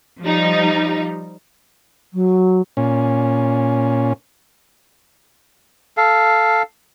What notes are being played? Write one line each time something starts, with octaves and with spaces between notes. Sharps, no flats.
F3 G3 D#4
F#3
A#2 C#4
A4 F5